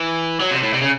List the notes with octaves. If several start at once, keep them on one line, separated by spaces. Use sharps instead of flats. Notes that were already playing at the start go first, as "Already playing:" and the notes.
Already playing: E3
F#3
C3
A2
C3
C#3